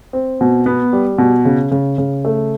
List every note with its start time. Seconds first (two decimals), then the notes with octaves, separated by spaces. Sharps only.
0.13 C4
0.41 B2
0.66 B3
0.93 G3
1.18 B2
1.45 C#3
1.71 C#3
1.98 C#3
2.25 A3